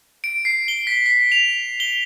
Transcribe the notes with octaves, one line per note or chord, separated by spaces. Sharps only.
D7
C7
G7
B6
B6
F7
G7